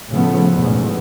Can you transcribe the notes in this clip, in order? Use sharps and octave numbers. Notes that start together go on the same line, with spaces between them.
A2 C#3 F3 A3 B3
A1 E2 G#2 B2